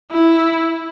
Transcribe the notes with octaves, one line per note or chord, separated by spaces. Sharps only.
E4